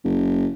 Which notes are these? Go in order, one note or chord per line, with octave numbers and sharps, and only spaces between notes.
F#1